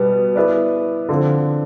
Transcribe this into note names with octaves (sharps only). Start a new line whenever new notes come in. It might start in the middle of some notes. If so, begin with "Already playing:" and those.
Already playing: B2 G3 B3
B3 E4 B4 D5
D3 F3 C4